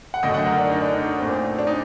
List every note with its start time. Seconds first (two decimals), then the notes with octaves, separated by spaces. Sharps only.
0.14 F#5
0.23 F#2 D3 A3 D#5
0.34 F#5
0.46 A#4
0.59 D4
0.71 D#4
0.82 D4
0.93 D#4
1.18 A#2 A3 C4
1.59 D4
1.67 D#4